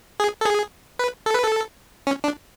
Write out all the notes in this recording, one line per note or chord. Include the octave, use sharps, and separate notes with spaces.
G#4
A4
G#4
B4
A4
B4
A4
C#4
D4